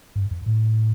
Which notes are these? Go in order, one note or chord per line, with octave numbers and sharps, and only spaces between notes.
G2
F2
A2